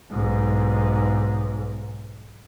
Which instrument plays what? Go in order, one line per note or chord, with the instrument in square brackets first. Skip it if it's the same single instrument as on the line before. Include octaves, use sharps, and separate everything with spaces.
[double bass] B1 G#2